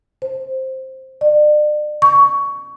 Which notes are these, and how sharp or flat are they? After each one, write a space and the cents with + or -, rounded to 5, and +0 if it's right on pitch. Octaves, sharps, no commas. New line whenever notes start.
C5 +5
D5 +35
C#6 +15